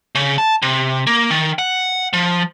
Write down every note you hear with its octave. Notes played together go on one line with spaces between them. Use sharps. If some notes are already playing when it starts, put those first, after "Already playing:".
C#3
A5
C3
A#3
D#3
F#5
F3